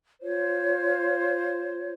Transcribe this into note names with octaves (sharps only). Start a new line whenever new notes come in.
F4 C5 C#5